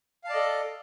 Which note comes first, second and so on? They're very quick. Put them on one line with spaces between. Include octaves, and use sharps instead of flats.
F5 A5 D5 D#5 A4